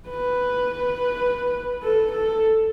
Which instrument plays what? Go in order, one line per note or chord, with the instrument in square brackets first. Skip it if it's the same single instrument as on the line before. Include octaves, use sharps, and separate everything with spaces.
[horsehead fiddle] B4
A4
A4